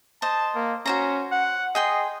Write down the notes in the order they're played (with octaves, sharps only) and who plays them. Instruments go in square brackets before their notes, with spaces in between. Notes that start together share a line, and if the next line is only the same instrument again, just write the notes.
[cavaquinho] C5 D#5 [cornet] A5
[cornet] A#3
[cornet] C#4 [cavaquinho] F#4 C5 A#5
[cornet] F#5
[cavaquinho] G#4 G5 C6 [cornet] D#5